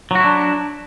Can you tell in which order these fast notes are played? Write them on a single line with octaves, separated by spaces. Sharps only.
F#3 F#4 E4 D4